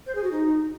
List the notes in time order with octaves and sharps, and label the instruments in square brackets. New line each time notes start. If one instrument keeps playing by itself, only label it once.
[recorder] C5
G#4
F#4
D#4